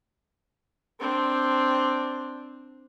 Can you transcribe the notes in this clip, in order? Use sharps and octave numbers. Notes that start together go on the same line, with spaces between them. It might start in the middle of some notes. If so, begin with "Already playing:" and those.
C4 D4